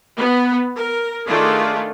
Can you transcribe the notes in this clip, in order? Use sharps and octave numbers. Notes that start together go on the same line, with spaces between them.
B3
A#4
D#3 A3 D4 F4 G#4